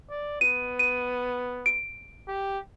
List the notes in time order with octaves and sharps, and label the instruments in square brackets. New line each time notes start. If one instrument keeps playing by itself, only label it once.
[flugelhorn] D5
[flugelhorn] B3 [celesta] D#7
[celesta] D#7
D7
[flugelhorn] G4